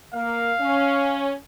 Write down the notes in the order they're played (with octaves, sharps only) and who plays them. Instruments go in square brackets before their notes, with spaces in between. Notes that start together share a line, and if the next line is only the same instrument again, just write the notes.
[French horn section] A#3 [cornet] F5
[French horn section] C#4